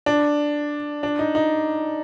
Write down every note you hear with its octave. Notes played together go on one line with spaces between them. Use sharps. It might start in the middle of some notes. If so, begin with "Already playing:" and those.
D4
D4
D#4
D#4